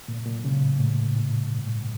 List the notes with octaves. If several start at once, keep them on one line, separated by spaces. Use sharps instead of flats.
A#2
A#2
C#3
A2
A2
A#2
G2
A2
G2